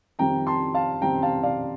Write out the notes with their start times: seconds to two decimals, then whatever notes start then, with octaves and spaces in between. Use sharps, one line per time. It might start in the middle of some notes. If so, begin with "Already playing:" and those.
0.19 F2 D#3 G3 C4 G5 A#5
0.47 A5 C6
0.74 F5 A5
1.02 F2 D#3 G3 C4 G5 A#5
1.22 F5 A5
1.43 D5 F5